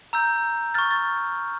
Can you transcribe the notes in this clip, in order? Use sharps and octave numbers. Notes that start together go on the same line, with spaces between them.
A#5 E6 G6
C#6 F6 A6
A6